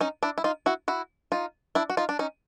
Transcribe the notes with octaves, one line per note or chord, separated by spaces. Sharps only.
C#4 D#4
D4 E4
E4
D#4 F4
E4 F#4
E4 F#4
D#4 F4
D4 E4
F#4
D#4 F4
D4
C#4 D#4